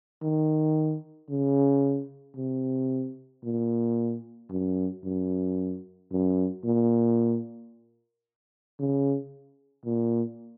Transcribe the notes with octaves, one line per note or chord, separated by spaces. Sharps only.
D#3
C#3
C3
A#2
F#2
F#2
F#2
A#2
C#3
A#2